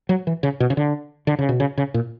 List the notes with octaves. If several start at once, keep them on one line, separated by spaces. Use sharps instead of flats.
F#3
E3
C#3
B2
C#3
D3
D3
C#3
B2
C#3
C#3
A#2